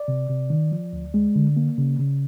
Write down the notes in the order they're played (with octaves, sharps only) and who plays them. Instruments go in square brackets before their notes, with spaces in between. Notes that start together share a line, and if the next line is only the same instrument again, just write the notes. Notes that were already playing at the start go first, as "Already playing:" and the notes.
Already playing: [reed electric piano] D5
C3
C3
D#3
F3
D2
G#3
D3
A#3
C#3
C#3